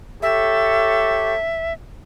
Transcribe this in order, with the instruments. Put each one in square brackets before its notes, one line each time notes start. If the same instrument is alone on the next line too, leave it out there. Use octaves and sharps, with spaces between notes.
[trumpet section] G4 A4 C#5 [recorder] E5